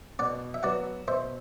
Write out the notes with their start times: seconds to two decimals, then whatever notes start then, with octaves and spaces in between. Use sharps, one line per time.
0.19 B2 D5 F#5
0.54 E5
0.63 F#3 B3 F#4 D5 F#5
1.08 B2 C5 E5